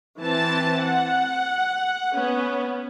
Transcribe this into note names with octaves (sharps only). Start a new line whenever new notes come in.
E3 C4 A5
F#5
B3 C#4